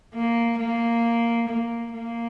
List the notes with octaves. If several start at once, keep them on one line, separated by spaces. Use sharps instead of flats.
A#3
A#3
A#3
A#3